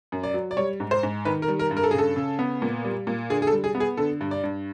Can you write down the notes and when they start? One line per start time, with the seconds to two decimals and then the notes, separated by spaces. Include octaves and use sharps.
0.12 F#2
0.24 D5
0.34 F#3
0.51 D5
0.57 G3 C#5
0.80 G#2
0.91 C5
1.03 G#2
1.25 D#3 B4
1.42 A#4
1.48 G3
1.59 A#4
1.71 G2
1.77 A#4
1.83 A4
1.91 G#4
1.94 C#3 A4
2.16 C#3
2.39 B3
2.62 A#2
2.84 G3
3.07 A#2
3.30 D3 G#4
3.42 G#4
3.47 A4
3.52 G3
3.64 G#4
3.75 B3
3.80 G#4
3.97 D3 A4
4.21 G2
4.31 D5
4.44 G2